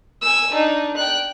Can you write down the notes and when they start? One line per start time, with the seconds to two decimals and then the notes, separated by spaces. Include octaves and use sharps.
0.22 G#5 E6
0.52 D4 D#4
0.97 G5 F#6